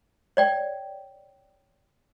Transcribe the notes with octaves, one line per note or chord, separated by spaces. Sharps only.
C#5 D5 G5